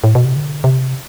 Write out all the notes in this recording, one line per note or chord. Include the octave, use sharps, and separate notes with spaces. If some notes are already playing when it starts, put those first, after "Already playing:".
A2
B2
C3
D3
C3